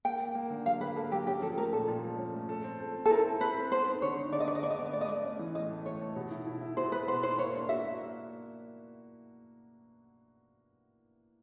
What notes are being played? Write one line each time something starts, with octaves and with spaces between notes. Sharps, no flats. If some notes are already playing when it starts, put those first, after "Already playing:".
A#3 G5
A#3
A#3
D3
F#3 F5
A#3 B4
A#3 A4
F#3 G4
C#4 G4
F3 A4
A3 A#4
A#2 A4
A#2
F3
C#4
A3
A4
C4
A4
C4
A4
E4 A#4
C4
C4 B4
A4
B3 C5
D#4
D3 C#5
D#4
D3 D5
D#5
B3 D5
D#5
D3 D5
D#5
B3 D5
D#5
A3 D5
D#5
A3 D5
C#4
E3
A2 D#5
A3
A3 C#5
A3
B2
E4
E4
E4
B2 C5
B3 B4
B3 C5
E4 C5
A#3 C#5
D4
F#4 E5
A#3